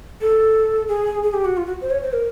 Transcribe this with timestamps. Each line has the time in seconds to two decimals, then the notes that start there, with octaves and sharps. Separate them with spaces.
0.21 A4
0.89 G#4
1.23 G#4
1.34 G4
1.45 F#4
1.57 F4
1.66 F#4
1.82 C5
1.91 C#5
2.03 C5
2.13 A#4